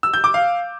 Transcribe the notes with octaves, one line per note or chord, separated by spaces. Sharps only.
E6
G6
D6
F5